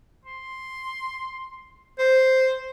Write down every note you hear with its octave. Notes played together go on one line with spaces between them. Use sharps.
C6
C5